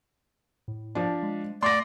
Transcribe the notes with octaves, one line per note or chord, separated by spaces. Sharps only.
A2
F3 D4
G#3
A3 D5 C6 A#6